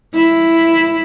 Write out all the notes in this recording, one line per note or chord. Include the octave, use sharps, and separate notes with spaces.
E4